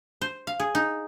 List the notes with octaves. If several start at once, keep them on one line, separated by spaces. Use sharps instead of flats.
C5
F5
G#4
D#4